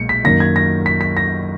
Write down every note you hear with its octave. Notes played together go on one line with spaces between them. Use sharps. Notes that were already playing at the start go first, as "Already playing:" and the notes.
Already playing: B1 A#2 G#3 C#7
B6
F#2 D#3 A#3 A#6
G#6
A#6
B6
B6
A#6